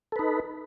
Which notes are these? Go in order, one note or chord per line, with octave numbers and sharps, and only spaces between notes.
D#4 A4 B4